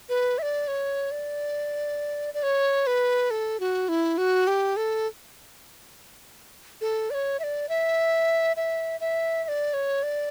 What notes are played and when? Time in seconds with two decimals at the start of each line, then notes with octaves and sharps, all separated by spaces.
0.09 B4
0.38 E5
0.42 D5
0.68 C#5
1.11 D5
2.34 D5
2.43 C#5
2.87 B4
3.31 A4
3.60 F#4
3.89 E4
4.18 F#4
4.47 G4
4.77 A4
6.81 A4
7.10 D5
7.14 C#5
7.40 E5
7.43 D5
7.69 E5
8.56 E5
9.00 E5
9.44 E5
9.48 D5
9.74 C#5
10.03 D5